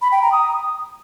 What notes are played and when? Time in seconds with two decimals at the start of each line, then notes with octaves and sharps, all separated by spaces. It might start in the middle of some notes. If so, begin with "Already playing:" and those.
0.02 B5
0.12 G5
0.22 A#5
0.32 D#6